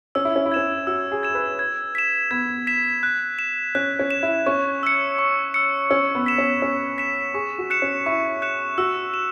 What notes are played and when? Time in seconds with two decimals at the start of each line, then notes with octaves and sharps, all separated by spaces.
0.15 C#4 E6
0.25 E4
0.36 C#4
0.46 E4
0.52 C#4 G#6 E7
0.87 F#4 E6
1.12 G#4
1.23 G#6 E7
1.35 B4
1.59 G#6
1.95 B6 E7
2.31 B3 G#6
2.67 B6 E7
3.03 F#6
3.39 E7
3.75 C#4 F#6
3.99 C#4
4.11 E7
4.23 E4
4.46 C#4 C#6
4.83 E6 C#7
5.19 C#6
5.54 E6 C#7
5.91 C#4 E6
6.15 B3
6.26 B6 E7
6.38 C#4
6.62 C#4 E6
6.98 B6 E7
7.34 G#4 C#6
7.58 F#4
7.70 F#6 C#7 E7
7.82 C#4
8.06 E4 C#6
8.42 F#6 C#7 E7
8.78 F#4 E6
9.14 E7